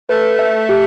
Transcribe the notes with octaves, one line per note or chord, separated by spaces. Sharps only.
A3 B4
E5
G4